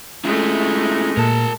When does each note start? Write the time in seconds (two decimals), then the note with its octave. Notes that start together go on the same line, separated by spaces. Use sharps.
0.24 G#3 A3 C#4 E4 F4
1.17 A#2 A#4 A5